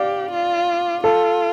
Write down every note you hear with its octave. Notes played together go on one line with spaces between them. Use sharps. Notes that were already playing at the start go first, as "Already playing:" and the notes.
Already playing: G4 D5 F5
F4
F4 A4